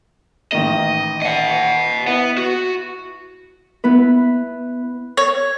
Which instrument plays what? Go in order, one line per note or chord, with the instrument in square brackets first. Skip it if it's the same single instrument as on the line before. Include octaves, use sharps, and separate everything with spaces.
[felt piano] A1 D#3 A#3 [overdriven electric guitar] D#5
[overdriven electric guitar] D#5 F#5
[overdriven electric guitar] B3 [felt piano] E4
[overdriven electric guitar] F#4
[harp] B3 E4 B4
[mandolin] C#5